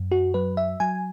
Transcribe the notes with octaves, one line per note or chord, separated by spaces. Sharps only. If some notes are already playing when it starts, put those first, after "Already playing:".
Already playing: F#2
F#4
F#3 B4
E5
F#3 G#5